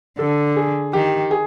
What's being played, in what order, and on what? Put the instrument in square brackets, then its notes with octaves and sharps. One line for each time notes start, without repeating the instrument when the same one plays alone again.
[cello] D3 [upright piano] A4
[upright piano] G#4
[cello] D#3 [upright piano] G4
[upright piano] G#4